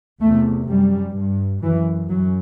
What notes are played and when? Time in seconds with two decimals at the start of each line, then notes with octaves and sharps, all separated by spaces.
0.21 E2 C3 A3
0.68 F#2 G3
1.15 G2
1.62 F#2 E3
2.09 F#2 F#3